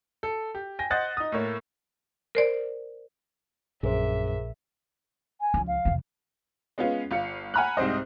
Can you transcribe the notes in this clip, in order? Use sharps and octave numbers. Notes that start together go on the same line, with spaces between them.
A4
G4
G5 G#5 A#6
C5 D#5 F#5 F#6 A6 A#6
D#4 D#6
A2 A3 A#3 C#5
A#4 C5 D5
A#1 F#2 G#4 A#4 C5 E5
G#5
C#2 F3
F5
E2 C3
G#3 B3 C#4 F4
G1 F4 F5 C#7
F#5 G#5 A#5 B5 F6 F#6
C2 G#2 C4 C5 D#5